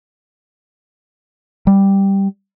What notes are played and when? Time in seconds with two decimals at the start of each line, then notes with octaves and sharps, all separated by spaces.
1.67 G3